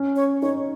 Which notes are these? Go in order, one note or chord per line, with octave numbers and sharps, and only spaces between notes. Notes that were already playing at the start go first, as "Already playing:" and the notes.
Already playing: C#4
C#5
D#4 C#5